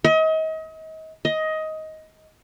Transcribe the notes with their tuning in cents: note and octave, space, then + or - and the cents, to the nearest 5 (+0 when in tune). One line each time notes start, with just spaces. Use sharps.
D#5 +35
D#5 +15